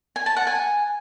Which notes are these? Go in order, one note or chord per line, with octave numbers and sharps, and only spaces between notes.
G#5
A5
F#5
G#5